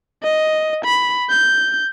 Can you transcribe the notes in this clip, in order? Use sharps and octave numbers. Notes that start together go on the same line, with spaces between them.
D#5
B5
G6